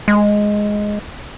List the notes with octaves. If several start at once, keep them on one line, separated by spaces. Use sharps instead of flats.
G#3